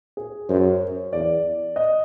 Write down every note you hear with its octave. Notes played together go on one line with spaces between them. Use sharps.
G#4
F#2 C5
C#5
E2 D5
D#5